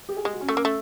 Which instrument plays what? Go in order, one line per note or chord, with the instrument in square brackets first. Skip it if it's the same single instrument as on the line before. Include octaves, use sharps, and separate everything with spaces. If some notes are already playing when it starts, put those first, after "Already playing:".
[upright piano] G4
G#4
[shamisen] G#3 [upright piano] G4
[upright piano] F#4
C#4
[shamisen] A3
[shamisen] A#3 [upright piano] C#4
[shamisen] A3